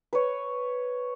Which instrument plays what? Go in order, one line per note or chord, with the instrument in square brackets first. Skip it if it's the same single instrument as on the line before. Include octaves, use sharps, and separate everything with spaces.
[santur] B4 C#5